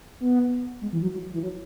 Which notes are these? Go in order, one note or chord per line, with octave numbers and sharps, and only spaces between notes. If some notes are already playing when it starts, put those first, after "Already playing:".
B3
G#3
E3
F#3
F#3
E3
F#3